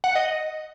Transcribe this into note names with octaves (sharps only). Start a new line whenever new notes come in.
F#5
D#5